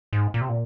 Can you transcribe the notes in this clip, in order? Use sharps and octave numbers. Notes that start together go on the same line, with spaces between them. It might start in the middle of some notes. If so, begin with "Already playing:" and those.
G#2
A#2
C3
A#2